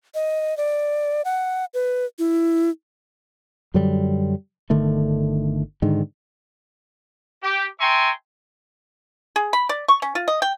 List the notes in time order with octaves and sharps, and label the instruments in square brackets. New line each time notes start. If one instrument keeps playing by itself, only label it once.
[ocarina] D#5
D5
F#5
B4
E4
[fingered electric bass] F#2 D3 F#3 G3
G1 D3 D#3 A3
G#2 D3 D#3
[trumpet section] G4
E5 G5 G#5 A#5 C6 C#6
[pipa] G#4
B5
D5
C#6
C#4
F4
D#5
G5